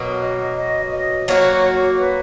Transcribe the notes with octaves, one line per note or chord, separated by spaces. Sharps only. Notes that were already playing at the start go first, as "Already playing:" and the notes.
Already playing: B2 F#3 A#3
D#5
D#5
D#5
F#3 A#3 D#4 F#4 C#5
B4